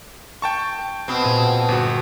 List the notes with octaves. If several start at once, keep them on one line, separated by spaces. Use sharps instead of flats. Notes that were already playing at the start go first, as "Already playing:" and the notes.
G5 A5 C#6
B2 C4
A#2 G#4
G1 F#4